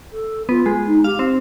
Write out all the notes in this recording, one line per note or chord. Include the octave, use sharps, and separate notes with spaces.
A4
B3 F4
G#3
D#4
G4 F5
C4